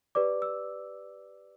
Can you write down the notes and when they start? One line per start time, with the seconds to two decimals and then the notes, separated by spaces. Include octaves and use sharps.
0.15 G4 B4 D5 D6
0.42 E6